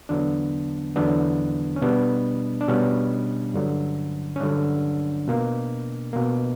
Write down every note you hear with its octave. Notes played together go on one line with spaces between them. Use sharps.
E2 D3 F#3 B3 D4
E2 D3 F#3 B3 D4
C#4
B2 G3 B3 D4
D4
B2 G3 B3 C#4
G2 D3 F#3
C#4
G2 D3 F#3 D4
B2 A#3
B2 A#3